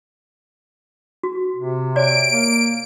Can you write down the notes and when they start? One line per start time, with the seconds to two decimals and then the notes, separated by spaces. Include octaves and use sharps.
1.23 F#4
1.56 C3
1.96 C#5 D5 D7
2.31 A#3